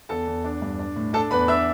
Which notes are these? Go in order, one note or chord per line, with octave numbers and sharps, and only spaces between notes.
E2 A4 A5
E2
D4
G2
D4
A2
D4 A4 A5
E2 B4 B5
D4 E5 E6